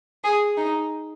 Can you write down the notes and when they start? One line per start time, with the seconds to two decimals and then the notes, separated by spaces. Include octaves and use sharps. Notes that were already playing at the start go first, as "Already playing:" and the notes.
0.24 G#4
0.57 D#4